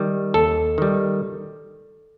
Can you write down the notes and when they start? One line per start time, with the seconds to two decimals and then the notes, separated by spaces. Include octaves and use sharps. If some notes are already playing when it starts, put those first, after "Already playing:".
Already playing: D#3 G3
0.34 D#2 A4
0.78 D#3 G3